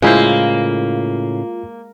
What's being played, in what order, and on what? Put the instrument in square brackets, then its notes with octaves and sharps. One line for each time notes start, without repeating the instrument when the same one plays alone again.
[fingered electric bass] A2 C#3 [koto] G#3 E4 C5 [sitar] A#3 [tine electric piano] F4